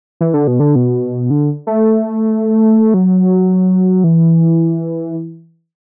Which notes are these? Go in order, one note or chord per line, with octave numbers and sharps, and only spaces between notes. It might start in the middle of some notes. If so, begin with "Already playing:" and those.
E3
D3
B2
D3
B2
D3
A3
F#3
E3